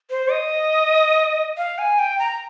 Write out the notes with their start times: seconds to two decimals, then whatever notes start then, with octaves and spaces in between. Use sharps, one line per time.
0.10 C5
0.31 D#5
1.57 F5
1.78 G#5
1.99 G5
2.19 A#5